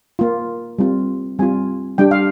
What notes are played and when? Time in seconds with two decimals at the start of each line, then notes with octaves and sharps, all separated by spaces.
0.19 A#3 F4
0.79 G3 C4 F4
1.39 G3 C4 F4 G#5
1.98 G3 D4 G4 G5
2.11 F5